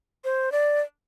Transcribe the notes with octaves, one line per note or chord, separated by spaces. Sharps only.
C5
D5